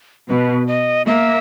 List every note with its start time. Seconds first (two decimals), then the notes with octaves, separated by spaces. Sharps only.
0.29 B2 B4
0.67 D#5
1.07 A#3 E5